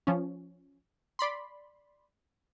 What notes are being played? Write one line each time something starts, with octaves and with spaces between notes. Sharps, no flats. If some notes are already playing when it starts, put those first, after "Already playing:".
F3 C#4
D5 B5 C6